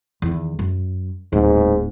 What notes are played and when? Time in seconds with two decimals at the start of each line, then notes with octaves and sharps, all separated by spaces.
0.22 E2 D#3
0.59 F#2
1.33 D1 G#2